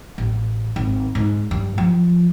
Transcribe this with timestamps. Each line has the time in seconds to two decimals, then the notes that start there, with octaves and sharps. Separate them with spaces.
0.18 A1
0.76 G#1
1.15 G#2
1.51 G2
1.78 F3